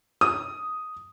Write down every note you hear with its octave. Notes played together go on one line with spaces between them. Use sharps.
D#6